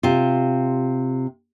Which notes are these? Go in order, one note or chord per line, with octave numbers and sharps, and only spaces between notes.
C3 F4